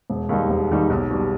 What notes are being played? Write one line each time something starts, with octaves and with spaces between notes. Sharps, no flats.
E1
D#2 D#3 G3 D#4
E1
D#2 D#3 G3 D#4
B1
B2 G3